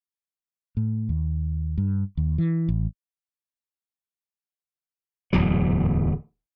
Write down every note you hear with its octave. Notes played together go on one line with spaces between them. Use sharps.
A2
D#2
G2
D#2
E3
A1
D1 E2 G#2 F#3